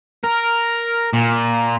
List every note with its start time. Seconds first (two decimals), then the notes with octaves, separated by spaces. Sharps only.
0.24 A#4
1.13 A#2